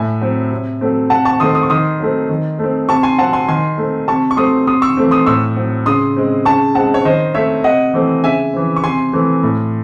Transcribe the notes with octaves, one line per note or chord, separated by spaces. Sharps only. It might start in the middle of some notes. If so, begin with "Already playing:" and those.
Already playing: A2 E5 G#5
F#3 C4
C3
F#3 A3 C4
C3 F#5 A5
A5 C#6
D#3 A3 C4 C6 D#6
D#6
C#6
D#3 C6 D#6
F#3 A3 C4
D#3
A3 C4
C3 A5 C#6
G#5 C6
F#3 C4 F#5 A5
G#5 C6
D#3 G#5 C6
A3 C4
C3 A5 C#6
C#6
F#3 A3 C4 C6 D#6
C3 C6 D#6
C#6 E6
E3 A3 C4
C6 D#6
A2 C#6 E6
F#3 C4
C#3 C6 D#6
G#3 C4
C#3 A5 C#6
G#3 C4 F#5 A5
C#5
D#3 C5 D#5
A3 C4 C#5 E5
C3 D#5 F#5
E3 A3 C4
C#3 E5 G#5
E3 C4
C#6
C3 G#5 C6
E3 A3 C4
A2